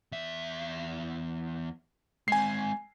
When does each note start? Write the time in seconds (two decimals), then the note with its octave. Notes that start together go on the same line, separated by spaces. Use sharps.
0.12 E2 E5
2.28 G#3 C4 G#5 C7